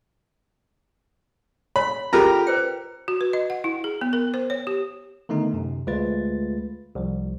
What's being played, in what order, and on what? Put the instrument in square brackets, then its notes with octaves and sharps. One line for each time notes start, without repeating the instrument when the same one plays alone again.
[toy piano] C#5 [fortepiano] B5
[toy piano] C#4 F4 A4 [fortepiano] G4 A#4 A#5
[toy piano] B4 C5 G5
[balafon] F#4
B4
D#5
F#5
E4
G#4
B3
A#4
C5
C#5
G4
[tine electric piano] D3 D#3 A3 B3 D#4
F#2 C3
D2 G#3 A3 F4 B4 A6
C2 F3